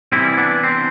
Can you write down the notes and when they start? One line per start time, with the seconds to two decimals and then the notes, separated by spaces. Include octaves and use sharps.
0.12 C2 C3 E3 G3 C4 E4
0.38 B3 D4
0.64 C4